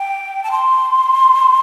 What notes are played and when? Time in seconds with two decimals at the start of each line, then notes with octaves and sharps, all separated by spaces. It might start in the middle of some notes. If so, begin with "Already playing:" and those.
Already playing: G5
0.44 A5
0.52 C6